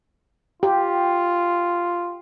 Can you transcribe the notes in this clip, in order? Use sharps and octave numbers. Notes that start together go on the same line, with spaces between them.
F4 G4